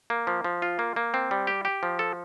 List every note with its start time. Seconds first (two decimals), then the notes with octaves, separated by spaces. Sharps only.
0.10 A#3
0.27 F3
0.44 F3
0.62 F4
0.79 A#3
0.96 A#3
1.14 C4
1.31 G3
1.47 G4
1.65 G4
1.83 F3
1.99 A4